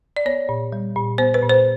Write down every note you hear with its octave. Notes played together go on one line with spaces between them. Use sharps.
D5
B3 C#5
A#2
G3
A#2
B3 C5
B4
A#2
C5